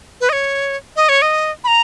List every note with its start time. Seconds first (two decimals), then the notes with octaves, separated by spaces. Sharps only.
0.21 B4
0.29 D#5
0.33 C#5
0.96 D#5
1.09 C#5
1.22 D#5
1.64 B5
1.68 A#5